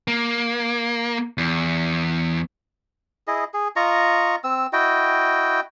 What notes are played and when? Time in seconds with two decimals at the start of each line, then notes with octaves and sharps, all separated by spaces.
0.08 A#3
1.38 E2
3.27 E4 G#4 D#5
3.54 G#4
3.76 F4 D#5 A#5 C#6
4.44 C4 E6
4.73 E4 F#4 D#5 G5